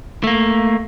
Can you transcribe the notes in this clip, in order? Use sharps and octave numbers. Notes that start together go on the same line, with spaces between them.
A3 A#3